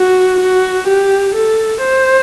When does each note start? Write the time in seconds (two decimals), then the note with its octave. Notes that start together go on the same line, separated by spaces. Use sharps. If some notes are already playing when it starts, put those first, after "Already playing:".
Already playing: F#4
0.40 F#4
0.88 G4
1.35 A4
1.81 C5